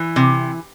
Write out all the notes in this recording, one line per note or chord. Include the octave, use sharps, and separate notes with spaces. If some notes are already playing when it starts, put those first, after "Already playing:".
Already playing: E3
C3